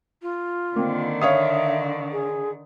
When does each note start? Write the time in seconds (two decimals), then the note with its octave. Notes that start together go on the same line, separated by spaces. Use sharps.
0.22 F4
0.76 D3 D#3 A#3 C4
1.21 C#5 E5 F5 D#6
2.12 G#4